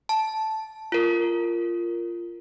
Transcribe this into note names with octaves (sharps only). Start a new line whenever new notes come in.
A5
F4 A#4